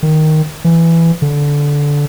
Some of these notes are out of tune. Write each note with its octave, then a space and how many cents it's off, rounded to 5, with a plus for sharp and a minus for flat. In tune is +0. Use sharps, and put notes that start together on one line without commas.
D#3 +0
E3 +10
D3 -15